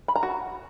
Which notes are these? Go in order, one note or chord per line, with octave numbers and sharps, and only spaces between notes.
B5
A#5
F#4